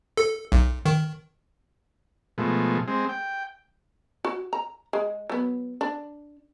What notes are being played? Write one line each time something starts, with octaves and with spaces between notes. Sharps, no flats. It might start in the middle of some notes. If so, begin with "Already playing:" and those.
A4
B1
D#3
B2 F3 G#3 A3
G#3 C4
G5
F#4
A#5
G#3
F#3 B3
D4